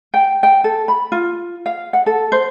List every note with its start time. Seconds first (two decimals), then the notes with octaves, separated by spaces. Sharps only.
0.14 G5
0.43 G5
0.64 A4
0.88 B5
1.12 F4
1.66 F5
1.93 F#5
2.06 A4
2.32 C5